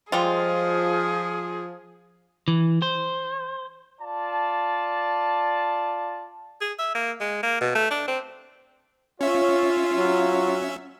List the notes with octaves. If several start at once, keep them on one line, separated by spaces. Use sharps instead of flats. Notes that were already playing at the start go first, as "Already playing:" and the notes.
F3 G3 G#3 F4 G#4
E3
C5
F4 D5 A5
G#4
E5
A#3
G#3
A#3
B2
A3
D4
C4
C#4 F4 C#5 E5
F#3